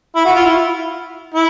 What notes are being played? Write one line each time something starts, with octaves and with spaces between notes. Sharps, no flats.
E4
F#4
F4
E4
E4